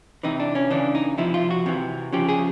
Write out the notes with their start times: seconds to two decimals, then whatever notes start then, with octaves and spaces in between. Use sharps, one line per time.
0.23 C3 E3 D#4
0.40 D4
0.55 C#4
0.70 C#3 E3 D4
0.95 D#4
1.18 C3 F3 E4
1.34 F4
1.51 F#4
1.66 C3 E3
2.13 C#3 F3 G4
2.29 G#4